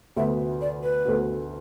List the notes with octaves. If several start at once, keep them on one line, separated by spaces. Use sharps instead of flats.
D2 D3 B3 F#4 E5
D5
B4
D2 D3 B3 F#4